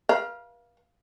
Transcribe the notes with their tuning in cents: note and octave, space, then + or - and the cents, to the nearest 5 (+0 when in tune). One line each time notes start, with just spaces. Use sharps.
B4 -45 F5 +0